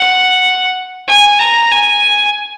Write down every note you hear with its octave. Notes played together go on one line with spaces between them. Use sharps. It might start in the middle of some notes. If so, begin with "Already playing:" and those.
Already playing: F#5
G#5
A#5
G#5